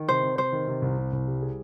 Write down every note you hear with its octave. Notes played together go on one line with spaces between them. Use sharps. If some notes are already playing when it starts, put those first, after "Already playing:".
Already playing: D#3
C3 C5
C3
C3 C5
D#3
C3
C2
C3
C2
G3
G#4